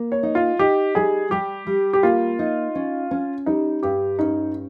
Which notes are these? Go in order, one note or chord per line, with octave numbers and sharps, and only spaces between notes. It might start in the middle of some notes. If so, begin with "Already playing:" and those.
Already playing: A#3
C#5
D#4
F4
D#4 G4
G3 G#4
G3 G4
G3
G4
A#3 F4
D#4
C#4
C#4
G3 D#4
G2 G4
C#4 D#4